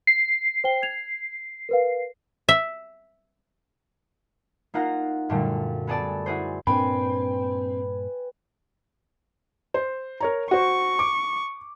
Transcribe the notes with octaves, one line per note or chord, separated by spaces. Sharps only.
C7
C5 G5 G7
G#6 F7
A#4 B4 F5
E5
A#3 D#4 F4 F#5 A#5 A#6
F#2 A#2 D3 G3 A3 A#3
B3 G#4 A4 D5 A5
E4 F#4 G#4 C5
G2 A#2 C4 D4 B4 G5 G#5 B5
C5
A#4 C#5 A#5
F#4 C5 C#6
D6